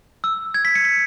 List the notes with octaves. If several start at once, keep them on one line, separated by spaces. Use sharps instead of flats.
E6
G#6
B6
C#7
B6